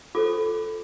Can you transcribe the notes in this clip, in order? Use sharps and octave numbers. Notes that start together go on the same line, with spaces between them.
F4 A4 C5 D6